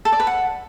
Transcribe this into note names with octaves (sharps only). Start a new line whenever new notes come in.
A4
D5
B4
F#5